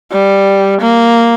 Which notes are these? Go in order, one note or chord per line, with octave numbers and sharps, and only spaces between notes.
G3
A#3